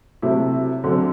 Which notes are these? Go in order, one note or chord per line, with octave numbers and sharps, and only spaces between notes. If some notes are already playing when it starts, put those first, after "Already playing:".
C3 F#3 A3 E4
F#2 D3 F#3 C4